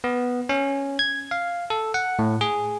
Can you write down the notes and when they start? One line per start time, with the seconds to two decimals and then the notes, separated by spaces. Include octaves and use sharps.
0.04 B3
0.49 C#4
0.99 G#6
1.31 F5
1.70 A4
1.94 F#5
2.19 A2
2.41 G#4